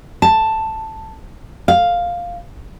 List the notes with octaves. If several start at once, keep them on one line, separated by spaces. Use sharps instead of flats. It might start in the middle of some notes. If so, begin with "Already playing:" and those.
A5
F5